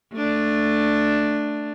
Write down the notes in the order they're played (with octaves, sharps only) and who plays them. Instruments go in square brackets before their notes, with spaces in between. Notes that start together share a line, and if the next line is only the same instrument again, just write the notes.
[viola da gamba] A3 D4